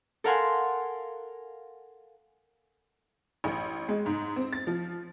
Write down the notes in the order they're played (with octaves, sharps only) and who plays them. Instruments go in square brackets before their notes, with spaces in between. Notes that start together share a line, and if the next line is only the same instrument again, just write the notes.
[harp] A4 A#4 F5 F#5 G#5 C6
[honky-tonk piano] A1
G#3
G#2
C4
A6
F3